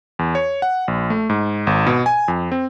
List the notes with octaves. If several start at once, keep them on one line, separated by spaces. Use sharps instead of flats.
E2
C#5
F#5
A#1
A3
G#2
G#1
B2
G#5
F2
C4